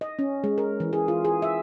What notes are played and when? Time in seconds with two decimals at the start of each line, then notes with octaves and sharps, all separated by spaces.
0.01 D#5
0.19 C#4
0.44 G#3
0.58 A#4
0.80 E3
0.93 G#4
1.08 F4
1.25 G#4
1.42 E5